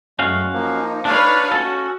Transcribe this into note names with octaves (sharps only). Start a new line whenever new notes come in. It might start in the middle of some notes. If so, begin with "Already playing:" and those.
F#2 G#3 A3 C#4 F#4 F5
F3 A#3 D#4
D4 B4 C#5 F5 A5
C#4 F#4 A4